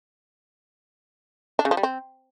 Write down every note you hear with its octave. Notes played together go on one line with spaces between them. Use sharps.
D4
C#3
F3
G3
C4